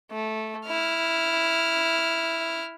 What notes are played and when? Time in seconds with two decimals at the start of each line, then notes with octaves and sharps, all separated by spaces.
0.11 A3
0.66 E4 F6